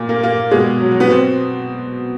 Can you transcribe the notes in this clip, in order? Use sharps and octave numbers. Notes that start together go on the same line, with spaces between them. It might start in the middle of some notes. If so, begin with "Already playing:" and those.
Already playing: A#2
A#3
A#3
B2 G#3
F#3
F#3
B3
B2 C4